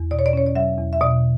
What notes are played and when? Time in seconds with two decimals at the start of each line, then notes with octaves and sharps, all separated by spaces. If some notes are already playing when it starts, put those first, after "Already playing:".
Already playing: E2
0.11 B2 D5
0.19 C#5
0.26 D5
0.33 C#4 C#5
0.46 D5
0.55 F#3 E5
0.78 E2
0.93 E5
1.01 B2 D5